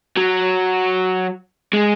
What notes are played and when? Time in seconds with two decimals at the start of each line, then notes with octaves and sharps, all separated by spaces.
0.17 F#3
1.73 G#3